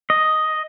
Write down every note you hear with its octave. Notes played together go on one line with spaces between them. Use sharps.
D#5